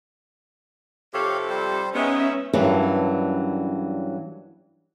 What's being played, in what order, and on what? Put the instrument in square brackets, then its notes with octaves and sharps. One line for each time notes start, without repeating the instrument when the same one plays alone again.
[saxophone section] F2 C3 A4 [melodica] G4 C#5 F5
[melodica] G3 C5
[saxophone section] G#3 B3 [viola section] C#4 E5 [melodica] D#4
[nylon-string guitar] G2 E3 F#3 A#3 C#4 D4